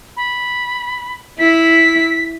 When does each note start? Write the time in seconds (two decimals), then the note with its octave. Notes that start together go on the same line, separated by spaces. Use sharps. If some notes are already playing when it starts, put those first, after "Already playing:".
0.17 B5
1.39 E4 B6